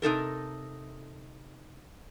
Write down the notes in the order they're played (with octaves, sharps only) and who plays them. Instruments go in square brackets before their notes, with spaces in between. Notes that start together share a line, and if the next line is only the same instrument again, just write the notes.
[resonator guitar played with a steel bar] C3 D#4 A4 A#4